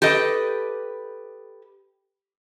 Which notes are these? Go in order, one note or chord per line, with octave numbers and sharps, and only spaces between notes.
G4 A4 B4 D#5